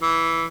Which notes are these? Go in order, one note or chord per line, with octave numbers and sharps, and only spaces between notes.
E3